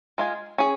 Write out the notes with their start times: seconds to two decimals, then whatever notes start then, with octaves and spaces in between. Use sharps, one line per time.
0.18 G#3 F4 G#4
0.58 C#4 G#4